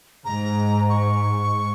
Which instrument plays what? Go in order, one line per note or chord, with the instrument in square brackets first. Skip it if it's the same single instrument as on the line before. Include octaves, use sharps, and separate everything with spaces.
[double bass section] G#2 [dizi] A#5
[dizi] C#6